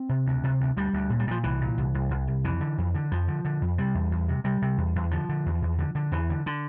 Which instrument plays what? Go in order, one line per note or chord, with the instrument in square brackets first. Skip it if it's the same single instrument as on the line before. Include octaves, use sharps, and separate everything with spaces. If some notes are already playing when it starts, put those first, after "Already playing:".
Already playing: [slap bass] C4
C3
D2
C3
D2
D2 G3
D2
A#2
G3
A#2 F3
C2 E3
A#2
C2
C2
C2
C2
F2 E3
D3
F2
D3
F2 F3
D3
D3
F2
C3 G3
E2
E2
C3
C3 G3
C3
E2
E2
D3 F3
D3
E2
E2
D3
D3
E2 E3
D3
D3